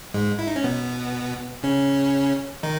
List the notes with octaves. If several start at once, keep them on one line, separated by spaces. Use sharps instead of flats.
G#2 G#3
E4
D#4
C#4
B2 B3
C#3 C#4
D#3 D#4